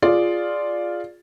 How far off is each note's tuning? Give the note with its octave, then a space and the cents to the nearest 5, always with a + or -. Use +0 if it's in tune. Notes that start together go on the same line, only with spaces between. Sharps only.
F4 +0 G#4 +0 D5 +0